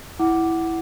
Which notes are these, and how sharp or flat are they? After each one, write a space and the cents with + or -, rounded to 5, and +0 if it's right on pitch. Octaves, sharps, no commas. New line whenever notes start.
E4 +0 F#5 +10 D6 +0